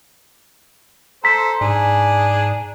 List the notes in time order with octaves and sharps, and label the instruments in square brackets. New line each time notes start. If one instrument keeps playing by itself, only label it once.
[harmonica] A4 C5 [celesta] A#5 B6
[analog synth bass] G#2 [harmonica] D4 G#4